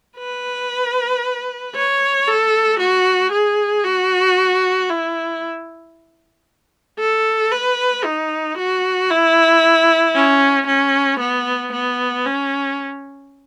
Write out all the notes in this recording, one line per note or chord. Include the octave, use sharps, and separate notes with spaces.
B4
C#5
A4
F#4
G#4
F#4
E4
A4
B4
D#4
F#4
E4
C#4
C#4
B3
B3
C#4